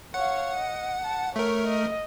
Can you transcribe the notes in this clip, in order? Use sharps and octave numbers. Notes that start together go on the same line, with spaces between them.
C#5 F5 F#5
D#5
A5
A3 A#4 C#5
D#5